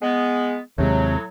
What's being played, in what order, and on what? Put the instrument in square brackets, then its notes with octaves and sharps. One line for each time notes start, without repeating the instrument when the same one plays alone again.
[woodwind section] G#3 B3
[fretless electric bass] D#2 C3 G#3 [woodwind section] A2 F#3